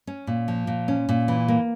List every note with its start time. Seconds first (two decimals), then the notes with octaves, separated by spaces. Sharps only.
0.07 C#4
0.27 A#2
0.48 F3
0.67 A#2
0.88 C#4
1.09 A#2
1.28 E3
1.48 A#3